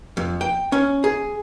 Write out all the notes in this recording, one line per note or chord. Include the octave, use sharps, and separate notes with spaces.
F2
G5
C#4
G#4